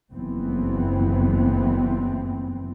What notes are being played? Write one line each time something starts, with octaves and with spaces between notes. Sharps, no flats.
F#1 F2 E3 B3 C4